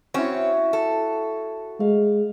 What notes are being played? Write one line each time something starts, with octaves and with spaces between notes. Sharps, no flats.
C4 C#4 E4 F#4
A4
G#3 F5